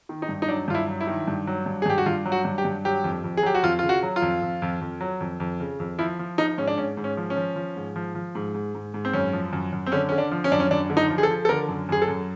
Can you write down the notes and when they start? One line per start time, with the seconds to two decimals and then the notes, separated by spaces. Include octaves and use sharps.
0.09 D#3
0.22 D#4
0.29 G2
0.42 D#4
0.48 F#3 D4
0.68 G2 F4
0.75 E4
0.88 F#3
1.01 E4
1.07 D#3
1.28 G2
1.47 F#3
1.66 G2
1.82 G#4
1.86 G2 G4
1.98 F#4
2.06 G2 F4
2.25 F#3
2.32 F#4
2.45 G2
2.58 G4
2.65 G2
2.85 F#3 G4
3.04 F2
3.24 F2
3.37 G#4
3.43 F#3 G4
3.55 F#4
3.63 F2 F4
3.79 C#3 F4
3.89 F#4
4.03 F#3
4.16 F4
4.22 F2
4.42 F2
4.62 F2
4.81 F2
5.01 F#3
5.20 F2
5.40 F2
5.60 C#3
5.80 F2
5.98 F3 E4
6.19 F3
6.38 F3 D#4
6.58 G#2 C#4
6.67 D4
6.77 G#2 C#4
6.97 G#2
7.04 C#4
7.17 F3
7.30 C#4
7.37 F3
7.56 F3
7.76 G#2
7.96 F3
8.15 F3
8.35 G#2
8.54 G#2
8.75 G#2
8.94 G#2
9.05 C4
9.13 F#2 C#4
9.33 F3
9.53 F#2
9.73 F#2
9.86 C4
9.92 D3 C#4
10.09 D3 C#4
10.18 D4
10.31 F3
10.44 C#4
10.52 F#2 D4
10.60 C#4
10.71 F#2 D4
10.90 D3
10.97 D#4
11.10 F3
11.18 G#4
11.23 A4
11.30 F3
11.45 A4
11.49 D3 A#4
11.69 F#2
11.89 F#2 G#4
12.02 A4
12.08 F#2